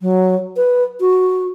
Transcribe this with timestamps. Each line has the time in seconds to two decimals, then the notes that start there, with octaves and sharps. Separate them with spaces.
0.01 F#3
0.57 B4
1.00 F#4